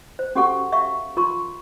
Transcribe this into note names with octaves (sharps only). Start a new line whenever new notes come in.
C5
C#4 F#4 G4 A4 F#5 C#6
E5 F5 C#6
F4 A#4 C6 C#6